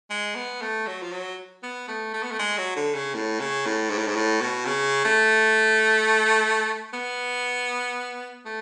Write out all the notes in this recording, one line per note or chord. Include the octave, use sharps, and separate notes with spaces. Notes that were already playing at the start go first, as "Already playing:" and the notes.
G#3
B3
A3
F#3
F3
F#3
B3
A3
A3
B3
A3
G#3
F#3
D3
C#3
A2
C#3
A2
G#2
A2
G#2
A2
B2
C#3
A3
B3
A3